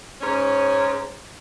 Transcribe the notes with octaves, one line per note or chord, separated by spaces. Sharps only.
G#2 C#4